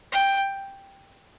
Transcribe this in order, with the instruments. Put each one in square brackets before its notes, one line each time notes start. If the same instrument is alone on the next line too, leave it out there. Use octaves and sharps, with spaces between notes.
[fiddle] G5